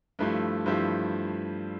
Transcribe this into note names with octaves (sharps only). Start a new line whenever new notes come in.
G2 F3 A3 E4 G4
G2 F3 A3 E4 G4